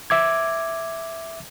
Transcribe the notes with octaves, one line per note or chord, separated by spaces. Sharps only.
E5 D6 G#6